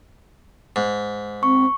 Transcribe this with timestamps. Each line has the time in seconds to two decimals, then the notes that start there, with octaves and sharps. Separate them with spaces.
0.76 G#2
1.43 C4 C#6